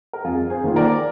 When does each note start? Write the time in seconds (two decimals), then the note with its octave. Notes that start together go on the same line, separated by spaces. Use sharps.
0.13 A#4
0.24 F2 F4 G#4
0.50 G#4 C5
0.64 D#3 A#3 F4
0.76 A#4 D5